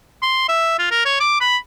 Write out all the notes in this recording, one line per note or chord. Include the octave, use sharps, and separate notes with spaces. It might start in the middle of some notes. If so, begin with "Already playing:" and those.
C6
E5
F4
A#4
C#5
D6
B5